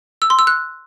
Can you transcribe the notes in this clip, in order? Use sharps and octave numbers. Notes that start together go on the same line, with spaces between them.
E6
C6
E6
F#6